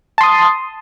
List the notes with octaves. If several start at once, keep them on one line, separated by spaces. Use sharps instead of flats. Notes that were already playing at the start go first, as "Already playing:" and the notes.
A5 C6 D#6